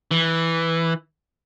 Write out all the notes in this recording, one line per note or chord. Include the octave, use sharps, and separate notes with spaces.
E3